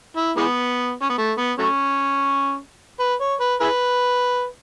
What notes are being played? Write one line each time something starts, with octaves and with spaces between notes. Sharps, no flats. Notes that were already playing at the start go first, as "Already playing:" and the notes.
E4
E3 G#3 B3
C#4
B3
A3
B3
F#3 A3 C#4
B4
C#5
B4
E4 G#4 B4